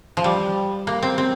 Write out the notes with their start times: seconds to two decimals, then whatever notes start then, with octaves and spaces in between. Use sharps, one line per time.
0.17 F3
0.24 G3
0.87 A#3
1.02 C4
1.18 C4